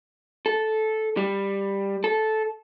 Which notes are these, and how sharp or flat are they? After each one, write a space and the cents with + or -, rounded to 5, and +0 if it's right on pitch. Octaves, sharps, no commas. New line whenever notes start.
A4 -10
G3 +10
A4 -10